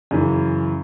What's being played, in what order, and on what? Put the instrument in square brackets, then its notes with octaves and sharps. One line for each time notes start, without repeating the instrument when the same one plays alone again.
[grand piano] F#2 C#3 E3